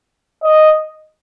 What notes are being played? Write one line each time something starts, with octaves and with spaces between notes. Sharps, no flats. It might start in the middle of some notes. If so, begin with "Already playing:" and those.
D#5